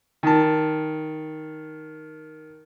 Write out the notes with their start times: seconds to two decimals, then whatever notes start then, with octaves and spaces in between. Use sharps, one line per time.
0.23 D#3 A5